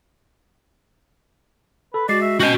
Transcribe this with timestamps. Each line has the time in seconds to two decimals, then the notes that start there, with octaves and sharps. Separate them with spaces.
1.94 A4 B4
2.09 G#3 F#4 D5 C7
2.21 E5
2.40 C#4 F#4 D#5 G5